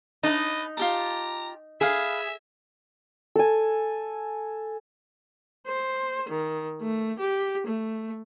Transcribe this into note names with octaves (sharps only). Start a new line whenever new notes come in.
D#4 B4 D#5 A5
F4 G4 A5 A#5
G#4 B4 E5 F5
A4 G#5
C5
D#3
A3
G4
A3